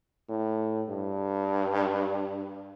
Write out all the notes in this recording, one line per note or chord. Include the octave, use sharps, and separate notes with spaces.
A2
G2